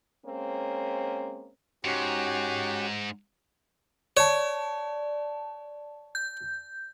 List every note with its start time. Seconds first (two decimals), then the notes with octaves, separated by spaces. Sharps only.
0.24 G#3 A#3 C4 C#4
1.85 G#2 C#4 F#4 G4
4.17 C#5 D5 A5
6.15 G6